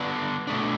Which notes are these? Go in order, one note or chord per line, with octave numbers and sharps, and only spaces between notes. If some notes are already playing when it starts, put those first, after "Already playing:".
Already playing: D3 G3 B3 D4
B2 A3 D4